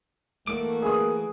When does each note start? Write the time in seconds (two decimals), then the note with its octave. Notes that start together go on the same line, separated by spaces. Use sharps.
0.47 E3 A3 A#3 F#4 D6
0.82 G#4 B4 D#6